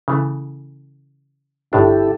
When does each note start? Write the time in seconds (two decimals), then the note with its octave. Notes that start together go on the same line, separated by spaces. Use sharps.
0.08 C#3 E3 A3
1.73 G1 A2 D4 E4 G4 A4